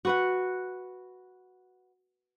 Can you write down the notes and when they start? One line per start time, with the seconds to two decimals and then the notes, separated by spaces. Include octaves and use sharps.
0.05 F#4 B4 F#5